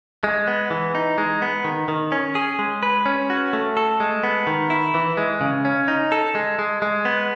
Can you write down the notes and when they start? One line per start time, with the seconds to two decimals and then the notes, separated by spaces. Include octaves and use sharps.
0.24 G#3
0.47 B3
0.71 E3
0.95 D#4
1.18 G#3
1.42 B3
1.64 D#3
1.88 D#3
2.12 C#4
2.35 G#4
2.59 G#3
2.83 B4
3.06 C#4
3.30 F#4
3.53 A3
3.77 A4
4.00 G#3
4.23 B3
4.47 D#3
4.70 E4
4.94 E3
5.17 G#3
5.41 C#3
5.65 C#4
5.88 D#4
6.12 A4
6.35 G#3
6.59 G#3
6.82 G#3
7.05 B3